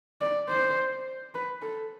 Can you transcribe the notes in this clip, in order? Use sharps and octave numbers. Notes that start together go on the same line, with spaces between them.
D5
C5
B4
A4